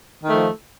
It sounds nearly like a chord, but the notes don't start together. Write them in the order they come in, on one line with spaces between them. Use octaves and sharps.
D#3 A3 F3